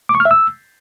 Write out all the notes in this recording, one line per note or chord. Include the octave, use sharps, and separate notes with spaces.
D6
C#6
F6
E5
E6